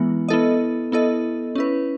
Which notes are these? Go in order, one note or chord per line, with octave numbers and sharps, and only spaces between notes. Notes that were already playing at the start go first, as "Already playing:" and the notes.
Already playing: E3 G#3 B3 E4
B3 E4 A4 D#5
B3 E4 A4 D#5
C#4 E4 B4